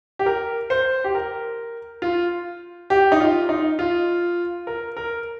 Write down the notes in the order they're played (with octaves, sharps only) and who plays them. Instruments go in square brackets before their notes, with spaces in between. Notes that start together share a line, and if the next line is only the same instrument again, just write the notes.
[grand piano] G4
A#4
C5
G4
A#4
F4
G4
D#4
F4
D#4
F4
A#4
A#4